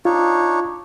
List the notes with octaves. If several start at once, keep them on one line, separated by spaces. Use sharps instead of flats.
D4 D#4 F4 C#5